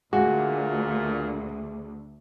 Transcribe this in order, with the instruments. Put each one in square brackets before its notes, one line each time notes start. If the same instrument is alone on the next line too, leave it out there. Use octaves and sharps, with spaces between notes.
[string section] D2 [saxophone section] A#2 [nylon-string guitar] G#3 [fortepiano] F#4